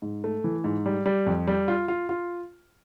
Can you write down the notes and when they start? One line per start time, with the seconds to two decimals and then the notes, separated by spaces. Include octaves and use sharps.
0.02 G#2
0.24 A3
0.44 E3
0.64 G#2
0.86 G3
1.06 G3
1.26 F2
1.47 G3
1.68 F4
1.88 F4
2.09 F4